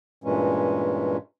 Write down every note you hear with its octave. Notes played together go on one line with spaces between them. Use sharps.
G2 A#2 E3 G#3 C#4